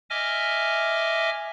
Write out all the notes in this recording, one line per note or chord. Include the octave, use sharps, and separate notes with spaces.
D#5 E5 G#5 D6 F6